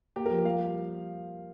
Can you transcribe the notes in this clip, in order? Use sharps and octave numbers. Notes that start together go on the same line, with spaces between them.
A#3 G4
A#4
F3
G3 F5